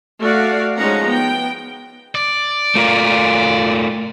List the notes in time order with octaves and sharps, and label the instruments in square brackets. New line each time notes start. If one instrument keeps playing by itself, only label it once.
[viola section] A3 F#4 D5 F5
F3 G#3 C#4 D#4 F#5 A#5
B3 G5
[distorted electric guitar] D5
[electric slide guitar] A3 F4 A#4